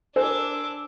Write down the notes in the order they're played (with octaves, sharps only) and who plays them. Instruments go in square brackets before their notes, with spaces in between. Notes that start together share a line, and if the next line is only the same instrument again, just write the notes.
[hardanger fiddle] D4 D6 [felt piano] A#4 C5 G#5 [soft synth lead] E6